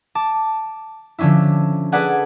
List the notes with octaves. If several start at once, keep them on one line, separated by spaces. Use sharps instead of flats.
A5 D6
D3 F3 C#4 D4 E4
G#4 A4 B4 D5 F#5 G#5